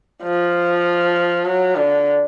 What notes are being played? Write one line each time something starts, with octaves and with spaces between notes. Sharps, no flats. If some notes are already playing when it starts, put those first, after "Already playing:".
F3
F#3
D3